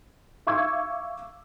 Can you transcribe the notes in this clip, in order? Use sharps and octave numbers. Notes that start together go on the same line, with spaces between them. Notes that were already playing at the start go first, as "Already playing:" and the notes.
E5 F5 C#6 D6 E6 G#6